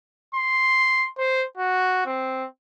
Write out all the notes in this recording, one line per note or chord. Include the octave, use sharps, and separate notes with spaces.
C6
C5
F#4
C4